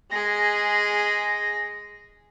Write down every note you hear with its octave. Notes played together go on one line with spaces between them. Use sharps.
G#3 G#4 A#6